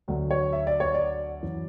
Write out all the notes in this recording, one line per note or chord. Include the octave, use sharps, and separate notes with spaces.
D2 D3 F#3
C#5
E5
D5
C#5
D5
F#2 E3